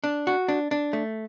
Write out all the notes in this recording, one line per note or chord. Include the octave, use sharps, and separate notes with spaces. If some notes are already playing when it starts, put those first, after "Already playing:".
D4
F#4
D4
D4
A3